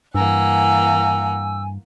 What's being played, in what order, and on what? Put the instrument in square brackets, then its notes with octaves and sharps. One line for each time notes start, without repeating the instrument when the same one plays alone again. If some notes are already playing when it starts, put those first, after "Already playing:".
[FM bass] G2 [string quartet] E3 A#3 F#5 [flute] G#5 [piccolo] E6